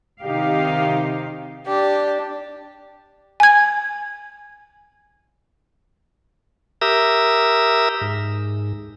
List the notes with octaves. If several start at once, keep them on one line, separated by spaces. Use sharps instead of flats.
C3 D#3 D#4 G4 F5
D4 G4
G#5 G#6
G4 A#4 E5 A#5 D#6 E6
G#2